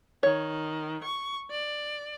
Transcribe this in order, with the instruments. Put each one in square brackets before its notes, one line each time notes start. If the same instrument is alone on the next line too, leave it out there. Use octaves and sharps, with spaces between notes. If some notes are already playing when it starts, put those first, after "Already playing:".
[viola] D#3 [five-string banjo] C#5
[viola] C#6
D5